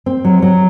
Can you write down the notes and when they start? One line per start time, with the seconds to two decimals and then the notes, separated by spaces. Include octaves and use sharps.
0.06 C4
0.24 F#3
0.42 F#3